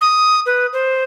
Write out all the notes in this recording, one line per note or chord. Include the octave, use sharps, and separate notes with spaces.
D#6
B4
C5